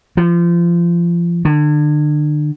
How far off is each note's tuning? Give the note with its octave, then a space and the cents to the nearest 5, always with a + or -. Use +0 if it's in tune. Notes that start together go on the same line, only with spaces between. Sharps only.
F3 -30
D3 +35